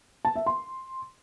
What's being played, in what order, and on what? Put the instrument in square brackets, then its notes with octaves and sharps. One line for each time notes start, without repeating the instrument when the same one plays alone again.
[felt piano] A5
E5
C6